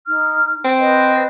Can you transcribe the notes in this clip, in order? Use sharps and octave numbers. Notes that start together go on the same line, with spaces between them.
D#4 F6
C4
B4 C5 D#5